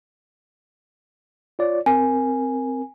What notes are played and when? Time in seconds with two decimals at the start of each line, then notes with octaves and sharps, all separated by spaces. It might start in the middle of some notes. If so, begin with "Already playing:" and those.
1.59 F4 C#5 D5
1.86 C4 A#4 G#5